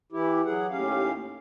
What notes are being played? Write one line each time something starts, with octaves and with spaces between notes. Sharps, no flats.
E3 E4 G4
F#3 G#4 F#5
D#2 A2 C#4 G4 F5